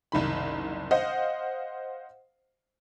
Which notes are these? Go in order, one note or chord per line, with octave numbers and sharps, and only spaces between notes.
F#1 C2 D#3 B5
C5 D#5 F5 F#5